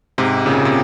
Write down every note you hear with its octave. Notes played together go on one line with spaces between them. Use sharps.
G#2 C3
A#2 C#3
C3